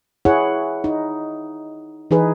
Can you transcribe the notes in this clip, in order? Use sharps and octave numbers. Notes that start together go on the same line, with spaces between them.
E4 G#4 C#5 F#5
D#4
E3 D#4 G#4 B4